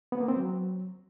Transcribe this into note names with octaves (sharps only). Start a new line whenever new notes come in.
B3
A#3
C4
F#3